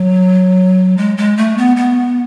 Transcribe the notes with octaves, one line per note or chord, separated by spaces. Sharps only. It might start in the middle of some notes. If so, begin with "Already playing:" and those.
Already playing: F#3
G#3
G#3
A3
B3
B3